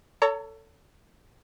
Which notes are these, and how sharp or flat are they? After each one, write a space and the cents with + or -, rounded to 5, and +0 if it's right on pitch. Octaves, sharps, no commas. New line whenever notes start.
A4 +20 C#5 +30 A#5 -30